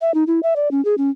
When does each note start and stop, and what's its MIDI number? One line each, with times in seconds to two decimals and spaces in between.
0.01 0.14 76
0.14 0.24 63
0.27 0.40 64
0.43 0.54 76
0.56 0.71 74
0.71 0.83 61
0.85 0.95 68
0.98 1.10 61